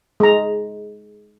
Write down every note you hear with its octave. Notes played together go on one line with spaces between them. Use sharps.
G#3 A#5